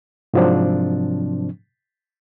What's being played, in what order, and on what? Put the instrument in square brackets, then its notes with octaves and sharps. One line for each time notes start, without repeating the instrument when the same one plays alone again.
[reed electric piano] G#2 C3 F3 F#3 C4 D4